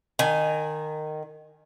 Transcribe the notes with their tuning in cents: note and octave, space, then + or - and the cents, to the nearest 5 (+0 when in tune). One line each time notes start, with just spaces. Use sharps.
D#3 -15 G#5 +0